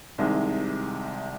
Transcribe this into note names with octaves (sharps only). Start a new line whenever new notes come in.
C2 C3 D#3 G#3